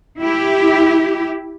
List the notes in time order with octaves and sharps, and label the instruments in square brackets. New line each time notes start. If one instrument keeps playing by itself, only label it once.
[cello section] E4 G4